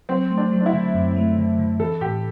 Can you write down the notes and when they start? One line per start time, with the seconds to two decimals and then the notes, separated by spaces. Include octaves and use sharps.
0.09 F#3 C4
0.30 A3
0.38 D4
0.52 F#3
0.61 D4
0.66 E4
0.74 D3
0.94 F#2
1.16 A3
1.37 D3
1.59 D3
1.80 E3 A4
2.01 A2 G4